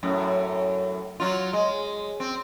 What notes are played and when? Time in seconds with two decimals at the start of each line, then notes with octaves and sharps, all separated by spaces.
0.03 F#2 A2
1.20 F#3 F4
1.53 G#3
2.20 C4